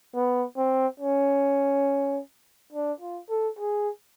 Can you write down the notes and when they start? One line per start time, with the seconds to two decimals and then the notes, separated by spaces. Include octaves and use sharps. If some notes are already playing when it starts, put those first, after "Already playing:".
0.15 B3
0.57 C4
1.00 C#4
2.72 D4
3.00 F4
3.29 A4
3.59 G#4